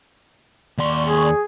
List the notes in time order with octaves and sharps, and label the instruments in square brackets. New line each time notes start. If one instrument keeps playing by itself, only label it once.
[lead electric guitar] D#2 C6 [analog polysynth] D5 C#6
[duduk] G#4